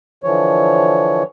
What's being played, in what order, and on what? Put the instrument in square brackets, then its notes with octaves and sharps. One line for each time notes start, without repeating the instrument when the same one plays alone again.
[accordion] D3 E3 F3 C#5